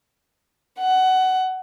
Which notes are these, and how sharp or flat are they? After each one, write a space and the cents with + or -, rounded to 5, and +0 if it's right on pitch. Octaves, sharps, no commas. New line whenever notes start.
F#5 +20